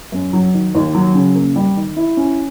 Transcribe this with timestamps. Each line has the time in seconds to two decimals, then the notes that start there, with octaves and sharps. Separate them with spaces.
0.12 F#2
0.33 F#3
0.54 D#3
0.75 D#2
0.94 F#3
1.15 C#3
1.35 A#3
1.56 G3
1.77 D#3
1.96 E4
2.17 C#4